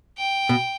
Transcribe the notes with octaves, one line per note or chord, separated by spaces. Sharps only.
G5
B2